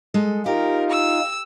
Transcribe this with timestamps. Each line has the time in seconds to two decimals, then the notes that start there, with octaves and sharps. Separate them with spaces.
0.14 G#3 A4 D#5
0.46 D#4 F4 G4 A#4
0.90 E6